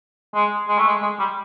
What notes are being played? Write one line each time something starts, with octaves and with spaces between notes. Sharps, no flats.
G#3
G#3
A3
G#3
G#3
G3